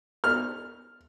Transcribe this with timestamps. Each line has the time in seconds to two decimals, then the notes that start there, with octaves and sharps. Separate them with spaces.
0.24 F6